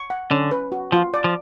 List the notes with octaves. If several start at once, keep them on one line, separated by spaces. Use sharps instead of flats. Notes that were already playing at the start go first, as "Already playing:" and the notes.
Already playing: C#6
F#5
D3 C#4
B4
F#4
F3 F4
D5
F3